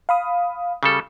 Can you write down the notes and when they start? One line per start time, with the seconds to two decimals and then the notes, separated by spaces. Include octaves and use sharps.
0.09 F5 B5 D#6
0.83 C#3 G3 A4